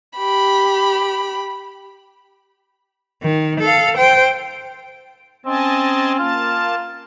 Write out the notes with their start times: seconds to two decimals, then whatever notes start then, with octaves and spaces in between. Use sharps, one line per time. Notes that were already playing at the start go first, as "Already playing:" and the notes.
0.18 G4 B5
3.23 D#3
3.61 A4 F5
3.97 C5 G5
5.46 C4 C#4 D#5 G#5 A5
6.19 A#3 F4 A5